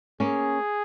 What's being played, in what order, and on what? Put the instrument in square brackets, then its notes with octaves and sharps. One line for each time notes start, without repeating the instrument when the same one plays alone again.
[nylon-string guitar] A#3 C#4 [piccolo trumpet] G#4